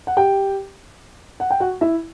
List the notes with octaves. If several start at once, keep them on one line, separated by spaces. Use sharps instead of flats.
F#5
G4 G5
F#5
G5
F#4 F#5
E4 E5